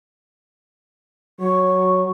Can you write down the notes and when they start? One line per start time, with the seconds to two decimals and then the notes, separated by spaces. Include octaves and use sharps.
1.40 F#3 C#6